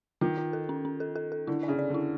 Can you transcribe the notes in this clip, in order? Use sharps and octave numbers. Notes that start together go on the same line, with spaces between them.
D#3 F4
F4
A4
C#4
C#4
A4
A4
A4
D3 E4
C#3 D5
D5
D3
E4